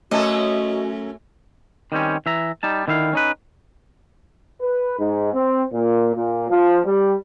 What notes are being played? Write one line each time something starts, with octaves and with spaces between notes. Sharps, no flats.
F#2 A3 C#4 F#4 A4 D#5
D#3 G3 C4 C#4
E3 E5 A#5
G3 D#4 A5
D3 D#3 E4 E5 F5
C#4 D#4 B4
B4
G#2
C4
A#2
A#2
F3
G3